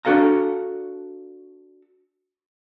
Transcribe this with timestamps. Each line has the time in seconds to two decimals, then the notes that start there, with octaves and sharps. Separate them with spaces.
0.05 D4 F#4 A4 F5 A#5